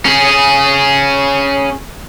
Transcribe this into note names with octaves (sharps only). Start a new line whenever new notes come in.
C#4 G#4